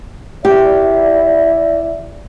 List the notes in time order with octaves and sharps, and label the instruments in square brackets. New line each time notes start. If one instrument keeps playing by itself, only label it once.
[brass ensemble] E4 D5 E5 [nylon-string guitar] G4